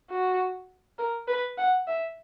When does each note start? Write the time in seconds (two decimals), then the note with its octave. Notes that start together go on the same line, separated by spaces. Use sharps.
0.10 F#4
0.99 A#4
1.28 B4
1.58 F#5
1.87 E5